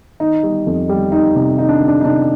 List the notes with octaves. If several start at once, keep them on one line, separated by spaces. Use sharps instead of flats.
D#3 D#4
G3
F2
G3
D#3 D#4
C3
D#3 D#4
D4
D#3
D4
D#4
C3 D4